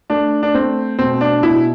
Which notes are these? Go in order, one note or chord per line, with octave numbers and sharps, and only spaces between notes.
A3 D4
D4
A3 C4
B2 C4
D4
B2 E4